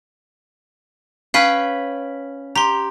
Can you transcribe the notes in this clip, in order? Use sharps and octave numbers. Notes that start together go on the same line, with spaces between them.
C#4 B4 F5 G5
G4 A#5 C6